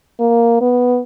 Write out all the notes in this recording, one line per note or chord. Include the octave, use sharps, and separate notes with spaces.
A#3
B3